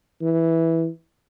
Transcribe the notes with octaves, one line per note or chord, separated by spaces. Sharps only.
E3